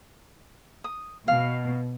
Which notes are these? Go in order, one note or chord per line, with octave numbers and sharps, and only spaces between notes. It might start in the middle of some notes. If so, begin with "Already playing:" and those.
D#6
B2 F5